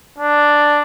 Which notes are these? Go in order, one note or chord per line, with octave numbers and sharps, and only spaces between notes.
D4